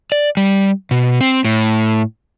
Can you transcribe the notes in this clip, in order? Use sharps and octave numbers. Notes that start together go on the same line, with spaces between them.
D5
G3
B2
C4
A2